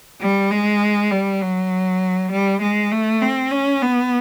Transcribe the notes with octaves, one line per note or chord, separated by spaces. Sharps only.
G3
G#3
G3
F#3
G3
G#3
A3
C4
C#4
B3